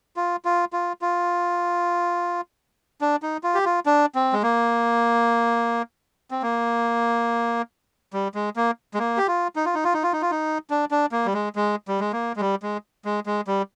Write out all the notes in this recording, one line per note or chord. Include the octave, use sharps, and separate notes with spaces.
F4
F4
F4
F4
D4
D#4
F4
G4
F4
D4
C4
G#3
A#3
C4
A#3
G3
G#3
A#3
G#3
A#3
G4
F4
D#4
F4
D#4
F4
D#4
F4
D#4
F4
D#4
D4
D4
A#3
G3
G#3
G#3
G3
G#3
A#3
G#3
G3
G#3
G#3
G#3
G3